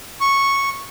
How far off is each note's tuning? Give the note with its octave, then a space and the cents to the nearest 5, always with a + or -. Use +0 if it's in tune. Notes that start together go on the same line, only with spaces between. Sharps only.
C#6 -5